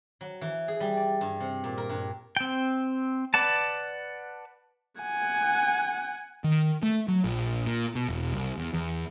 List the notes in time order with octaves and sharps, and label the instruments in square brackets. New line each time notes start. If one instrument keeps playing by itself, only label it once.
[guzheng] F#3
E3
G#4
G3
D5
G2
C3
A#2
A#4
G2
[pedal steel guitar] C4 G5
B4 D5 F#5 A5
[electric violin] F#5 G#5
[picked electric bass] D#3
A3
F#3
A#1
A#2
B2
E1
C2
E2
E2